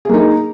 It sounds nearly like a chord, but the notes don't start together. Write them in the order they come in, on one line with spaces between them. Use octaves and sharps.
G#4 A#3 D#4